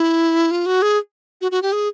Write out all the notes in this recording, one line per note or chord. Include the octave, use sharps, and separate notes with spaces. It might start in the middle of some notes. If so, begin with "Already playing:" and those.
Already playing: E4
F4
F#4
G#4
F#4
F#4
G4
G#4